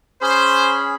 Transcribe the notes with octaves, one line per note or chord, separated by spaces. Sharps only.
C#4 G#4 C5 B5